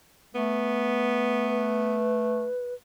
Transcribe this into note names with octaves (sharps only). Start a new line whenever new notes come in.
A3 B3
B4